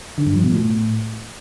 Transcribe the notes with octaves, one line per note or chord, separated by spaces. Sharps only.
D3
G2
F3
B2
A2